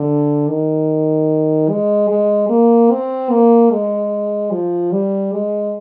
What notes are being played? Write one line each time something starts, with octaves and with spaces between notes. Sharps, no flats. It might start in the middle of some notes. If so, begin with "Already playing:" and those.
Already playing: D3
D#3
G#3
G#3
A#3
C4
A#3
G#3
F3
G3
G#3